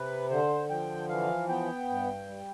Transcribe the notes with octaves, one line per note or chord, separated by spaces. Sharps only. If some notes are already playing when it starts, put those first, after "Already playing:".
Already playing: C3 B4
D3 C5
F3 G5
E3 F5
B3 G5
G2
G3